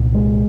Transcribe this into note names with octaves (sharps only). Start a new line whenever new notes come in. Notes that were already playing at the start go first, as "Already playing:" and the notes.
Already playing: C2 A#2
G#3